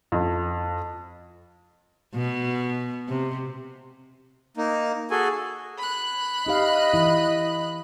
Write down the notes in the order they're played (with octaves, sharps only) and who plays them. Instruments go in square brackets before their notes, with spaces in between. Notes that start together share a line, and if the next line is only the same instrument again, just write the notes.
[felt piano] F2
[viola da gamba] B2
C3
[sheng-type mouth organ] A#3 D#4
F#4 G#4 A4 G#5
[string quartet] B5 F#6
[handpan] D#4 G4 F5 [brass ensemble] D#5
[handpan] E3 E4